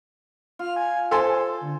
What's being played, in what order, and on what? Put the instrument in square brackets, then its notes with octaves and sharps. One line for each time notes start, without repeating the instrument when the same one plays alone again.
[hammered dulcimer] F4 [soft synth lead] F6
[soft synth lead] G#5
[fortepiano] A4 G#5 C6 [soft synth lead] C5
[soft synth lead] D3